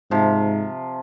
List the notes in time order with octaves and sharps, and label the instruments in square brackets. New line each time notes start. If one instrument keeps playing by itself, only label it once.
[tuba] G#2 [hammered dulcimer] C3 F3